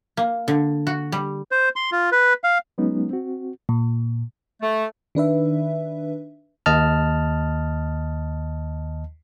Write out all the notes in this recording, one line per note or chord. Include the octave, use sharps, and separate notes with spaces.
A#3
D3
F#4
G3
C5
C6
F4
B4
F5
F#3 G#3 B3 C#4 D#4
C4 F#4
A#2
A3
D#3 D4 B4 E5
D#2 D#5 A5 F6